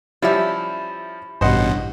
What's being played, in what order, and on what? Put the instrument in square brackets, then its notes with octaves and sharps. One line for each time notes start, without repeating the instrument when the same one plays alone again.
[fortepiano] F3 G3 C#4 [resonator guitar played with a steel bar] E4 E5
[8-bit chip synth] A1 B2 [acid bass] G2 [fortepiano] C5 D#5 F#5